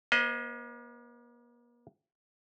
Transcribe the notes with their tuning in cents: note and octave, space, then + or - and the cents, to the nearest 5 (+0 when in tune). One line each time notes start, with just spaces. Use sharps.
A#3 +45 C5 +0 D#5 +0